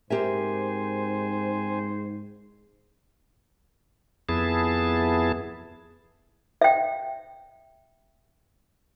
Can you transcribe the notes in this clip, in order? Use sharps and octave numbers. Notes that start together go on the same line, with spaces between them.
G#2 C4 G4 A#4 C5 E5 G#5
F2 B3 E4 G#4 A5
E5 G5